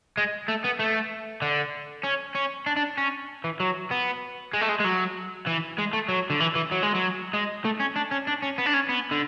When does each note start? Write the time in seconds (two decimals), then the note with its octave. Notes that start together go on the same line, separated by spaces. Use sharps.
0.17 G#3
0.48 A3
0.64 B3
0.79 A3
1.42 D3
2.04 C#4
2.35 C#4
2.66 D4
2.76 D4
2.98 C#4
3.44 E3
3.60 F#3
3.91 B3
4.53 G#3
4.61 A3
4.69 G#3
4.80 G#3
4.84 F#3
5.47 E3
5.78 G#3
5.93 A3
6.09 F#3
6.30 D3
6.40 E3
6.55 E3
6.71 F#3
6.83 G#3
6.94 F#3
7.33 G#3
7.65 A3
7.80 C#4
7.96 D4
8.11 C#4
8.27 D4
8.42 C#4
8.58 B3
8.66 D4
8.74 C#4
8.89 B3
9.12 D3